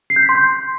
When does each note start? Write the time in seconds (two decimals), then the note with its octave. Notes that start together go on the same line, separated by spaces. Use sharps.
0.10 C7
0.16 G6
0.23 B6
0.29 C6
0.35 G6